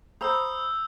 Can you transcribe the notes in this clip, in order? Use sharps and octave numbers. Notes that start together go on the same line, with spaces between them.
C5 A#5 B5 D#6 E6 G6